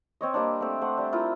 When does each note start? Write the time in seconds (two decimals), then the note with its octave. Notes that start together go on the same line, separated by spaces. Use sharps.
0.21 C4 C#5 D#5
0.34 G3 A#3 C4 D4
0.61 A3 C4
0.81 A3 C5 F#5
0.97 G3 D4
1.12 E4 F4 A#4 D#6